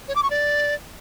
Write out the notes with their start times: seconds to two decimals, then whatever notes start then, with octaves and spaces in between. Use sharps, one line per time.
0.08 C#5
0.16 D6
0.23 C#6
0.30 D5